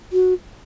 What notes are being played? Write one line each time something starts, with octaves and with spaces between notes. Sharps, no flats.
F#4